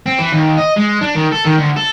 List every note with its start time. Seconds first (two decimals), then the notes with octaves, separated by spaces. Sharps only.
0.06 C4
0.18 E3
0.32 D#2
0.57 D#5
0.76 G#3
1.01 D4
1.16 D#3
1.32 A4
1.45 D#3
1.57 D2
1.76 A4